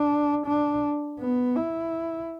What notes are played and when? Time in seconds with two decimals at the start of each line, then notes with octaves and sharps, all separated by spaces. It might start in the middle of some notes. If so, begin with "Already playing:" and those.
Already playing: D4
0.46 D4
1.19 B3
1.56 E4